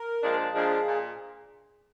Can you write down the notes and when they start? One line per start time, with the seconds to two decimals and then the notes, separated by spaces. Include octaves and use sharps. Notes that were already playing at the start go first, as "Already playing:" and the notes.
Already playing: A#4
0.23 A#2 F3 G#3 D4
0.54 A#2 F3 G#3 D4 G#4
0.86 A#2